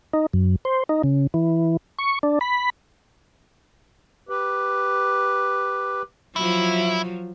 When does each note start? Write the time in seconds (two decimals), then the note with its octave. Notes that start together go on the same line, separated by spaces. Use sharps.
0.13 D#4
0.33 F#2
0.65 C5
0.89 D#4
1.03 C#3
1.34 E3
1.99 C#6
2.23 D4
2.41 B5
4.29 G4 B4
6.36 F3 F#3 E4